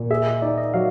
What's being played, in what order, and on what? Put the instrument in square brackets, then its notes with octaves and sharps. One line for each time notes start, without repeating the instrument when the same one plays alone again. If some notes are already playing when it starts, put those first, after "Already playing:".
Already playing: [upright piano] A#2
[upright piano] G#4 [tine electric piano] E5
[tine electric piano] D#5
[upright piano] D#4 [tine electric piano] D5
[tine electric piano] D#5
[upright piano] F#3 [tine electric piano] F5